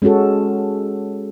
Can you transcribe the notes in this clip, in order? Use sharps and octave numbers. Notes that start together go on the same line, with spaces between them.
G#3 C#4 F#4 A4